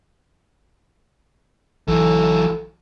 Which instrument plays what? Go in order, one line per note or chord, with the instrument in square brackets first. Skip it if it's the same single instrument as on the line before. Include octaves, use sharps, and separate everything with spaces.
[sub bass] A#1 [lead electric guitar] E3 F#3 [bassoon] A4